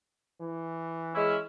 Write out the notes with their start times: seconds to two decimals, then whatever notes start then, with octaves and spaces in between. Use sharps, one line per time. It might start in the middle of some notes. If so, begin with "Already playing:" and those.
0.41 E3
1.14 G#3 C#4 E4